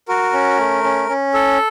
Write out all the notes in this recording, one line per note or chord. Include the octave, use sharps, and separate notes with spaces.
F#4 A#4
C#4
A3
C#4
C#4
A4